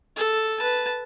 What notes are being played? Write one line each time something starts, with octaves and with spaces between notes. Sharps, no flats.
A4
B4 A5